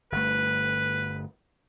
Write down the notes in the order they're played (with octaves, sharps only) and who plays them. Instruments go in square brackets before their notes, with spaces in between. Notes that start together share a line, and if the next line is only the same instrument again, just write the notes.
[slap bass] G1 A3 [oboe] B4